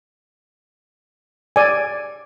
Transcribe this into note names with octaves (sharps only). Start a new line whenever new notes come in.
D5 G#5